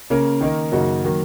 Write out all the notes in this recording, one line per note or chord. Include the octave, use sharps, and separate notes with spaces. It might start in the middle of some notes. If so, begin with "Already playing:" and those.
C#3 A#3 C#4 A#4
D#3 A#3 D#4 A#4
F#2 C#3 A#3 D#4 F#4
D#3 F#3 A#3